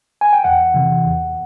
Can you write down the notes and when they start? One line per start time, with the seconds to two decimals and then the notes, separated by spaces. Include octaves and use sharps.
0.21 G#5
0.33 G5
0.44 E2 F#5
0.74 C3 E3
1.04 E2